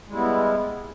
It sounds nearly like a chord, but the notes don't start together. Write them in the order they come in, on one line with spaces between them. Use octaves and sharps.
G#3 G3 E4 B3